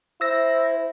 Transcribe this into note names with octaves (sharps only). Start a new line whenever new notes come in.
E4 C5 E6 A#6